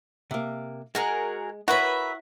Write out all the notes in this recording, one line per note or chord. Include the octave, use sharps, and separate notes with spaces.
C3 A#3
G#3 F#4 G#4 A#4
E4 F#4 A#4 B4 C#5 E5